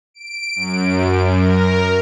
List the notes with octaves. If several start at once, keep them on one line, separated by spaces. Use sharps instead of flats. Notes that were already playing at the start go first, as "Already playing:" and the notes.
D7
F#2
A#4